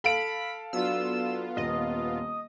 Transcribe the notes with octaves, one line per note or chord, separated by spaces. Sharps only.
A4 F5 A5 B5 D7
F#3 B3 D4 F4 E6
D#1 D#5